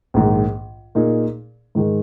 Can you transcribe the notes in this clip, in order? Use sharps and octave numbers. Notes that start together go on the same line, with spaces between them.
A#1 G#2 D#3
A#2 A#3 D#4 G#4
G#2 D#3 G#3